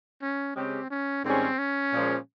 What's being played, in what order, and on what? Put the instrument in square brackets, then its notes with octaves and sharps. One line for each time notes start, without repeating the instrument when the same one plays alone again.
[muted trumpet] C#4
[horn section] C#3 G#3 C#4 G4 [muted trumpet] C4
[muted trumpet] C#4
[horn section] G#2 D#3 G3 C#4 G#4 [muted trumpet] C4
[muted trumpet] C#4
[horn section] A#2 F3 G#3